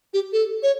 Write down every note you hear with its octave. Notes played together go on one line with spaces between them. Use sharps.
G4
A4
C#5